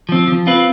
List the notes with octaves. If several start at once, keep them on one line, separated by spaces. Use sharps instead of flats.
F3 C4
F3
C4 F4 B4